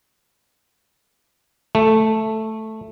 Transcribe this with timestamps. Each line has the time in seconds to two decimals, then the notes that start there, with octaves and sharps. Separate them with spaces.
1.75 A3